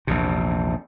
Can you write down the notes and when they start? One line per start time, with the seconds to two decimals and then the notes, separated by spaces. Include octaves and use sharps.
0.07 A#1 E2 C3